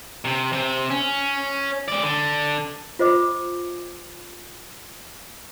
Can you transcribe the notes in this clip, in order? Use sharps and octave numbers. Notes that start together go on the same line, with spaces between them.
C3
C3
C#4
G#3 D5
D3
F4 C5 D#5 D6